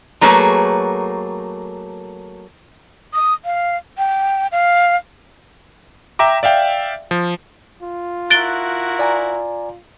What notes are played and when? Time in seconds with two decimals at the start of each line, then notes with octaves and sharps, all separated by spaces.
0.21 F#3 A3 A#3 G#4 B4 C#5
3.14 D#6
3.45 F5
3.98 G5
4.52 F5
6.19 E5 G5 A#5 D6
6.43 D5 E5 F5 G5
7.11 F3
7.82 F4
8.30 E4 F#4 A#4 F#6 A6 D7 G7
8.99 D5 G#5 A#5